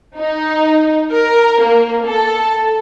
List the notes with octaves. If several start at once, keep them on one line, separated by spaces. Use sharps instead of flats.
D#4
A#4
A#3
A4